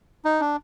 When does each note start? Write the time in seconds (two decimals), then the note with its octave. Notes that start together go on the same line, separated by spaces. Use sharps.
0.25 D#4
0.40 D4